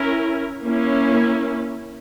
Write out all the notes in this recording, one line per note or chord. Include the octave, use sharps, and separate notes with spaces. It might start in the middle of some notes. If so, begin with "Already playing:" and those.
Already playing: C#4 E4 A#4
A#3 C#4 E4